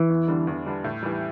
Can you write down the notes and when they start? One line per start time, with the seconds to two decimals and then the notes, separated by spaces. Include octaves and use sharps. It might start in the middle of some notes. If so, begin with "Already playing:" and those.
Already playing: E3
0.09 E2
0.28 D3 G3 B3 D4
0.47 E2
0.66 D3 G3 B3 D4
0.84 A2
1.03 E3 G3